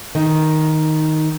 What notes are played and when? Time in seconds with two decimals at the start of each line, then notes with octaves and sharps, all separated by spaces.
0.15 D#3